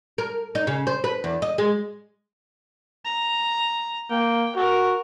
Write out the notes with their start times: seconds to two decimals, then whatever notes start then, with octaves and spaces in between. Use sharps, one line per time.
0.18 A#4
0.55 D#4
0.67 C#3
0.87 C5
1.04 B4
1.24 E2
1.42 D#5
1.58 G#3
3.05 A#5
4.10 A#3 G5
4.56 F#4 A#4